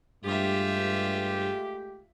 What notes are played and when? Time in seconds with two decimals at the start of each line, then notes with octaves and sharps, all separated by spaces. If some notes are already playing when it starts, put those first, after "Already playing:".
0.25 G2 G#3 A3 F4 G4 E5